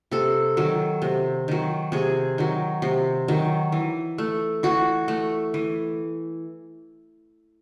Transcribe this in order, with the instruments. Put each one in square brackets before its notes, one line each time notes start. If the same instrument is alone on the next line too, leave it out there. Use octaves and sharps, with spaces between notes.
[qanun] C3 A4
D#3 F#3
C3
D#3 F#3
C3 G#4
D#3 F#3
C3
D#3 F#3
E3
A3
E3 F#4
A3
E3